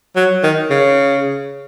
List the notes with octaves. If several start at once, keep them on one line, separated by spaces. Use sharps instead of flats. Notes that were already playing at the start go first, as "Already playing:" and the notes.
F#3
D#3
C#3